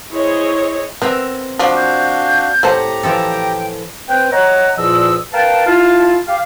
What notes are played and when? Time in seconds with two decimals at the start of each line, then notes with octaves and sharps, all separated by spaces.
0.10 E4 G#4 C5 C#5 D#5
1.02 B3 C4 A#4 E5
1.59 F3 D4 F#4 F5 D6
1.77 G6
2.63 A2 A3 G4 C5 F#5 A5 A#5
3.03 E3 F3 A4 G5
4.09 C4 B4 G5
4.32 C#5 D#5 F#5 A#5
4.78 E2 A#2 F3 F4 D#5 E6
5.33 A#4 B4 F5 G5 A5
5.67 E4 F4 F5 A5
6.28 G4 F5